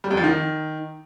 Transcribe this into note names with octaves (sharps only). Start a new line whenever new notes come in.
G3
F2
F3
D#3